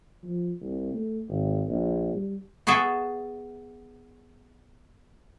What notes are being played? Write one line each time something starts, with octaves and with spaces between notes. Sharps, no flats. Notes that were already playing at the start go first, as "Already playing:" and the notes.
F3
C2
A3
G#1
A#1
G3
B3 F#4 G#4 A4 E5